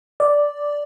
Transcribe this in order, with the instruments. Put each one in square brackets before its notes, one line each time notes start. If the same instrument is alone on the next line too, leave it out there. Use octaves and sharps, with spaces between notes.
[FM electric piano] D5